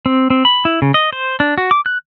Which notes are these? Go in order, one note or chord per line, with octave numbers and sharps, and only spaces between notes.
C4
C4
B5
E4
C#3
D#5
C5
D4
F#4
D6
F#6